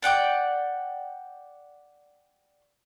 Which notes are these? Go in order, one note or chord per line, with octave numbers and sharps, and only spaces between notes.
D5 F#5 G5 D6